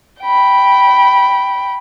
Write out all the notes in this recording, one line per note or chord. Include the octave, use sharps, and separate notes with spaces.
G5 B5